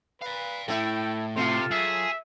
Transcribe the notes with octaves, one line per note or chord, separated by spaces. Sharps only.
B4 D5 F5
A2 A3 E4 G5
C3 A3 F4 C6
F#3 G#4 E5